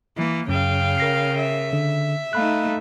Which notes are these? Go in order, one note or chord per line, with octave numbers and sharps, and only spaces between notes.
E3 A#3
F#2 C#3 F5 G5
A#4 A#6 C7
E5
D3
A3 D#4 F5 B5 F#6